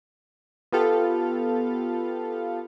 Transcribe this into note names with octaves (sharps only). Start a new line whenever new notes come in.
B3 F4 G4 A4 F5